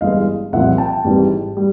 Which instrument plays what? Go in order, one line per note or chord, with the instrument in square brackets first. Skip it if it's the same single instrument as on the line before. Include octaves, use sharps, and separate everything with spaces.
[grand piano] G1 G2 E3 G#3 D#5 F5
C2 A#2 F3 E5 F#5
G5 A5
G#1 G#2 E3 G3
G3